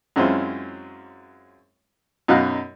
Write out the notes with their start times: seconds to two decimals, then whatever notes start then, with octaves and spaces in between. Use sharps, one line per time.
0.16 F#2 G#3 C4 C#4 E4 F4
2.28 F#2 B2 F#3 D#4 F5 F#6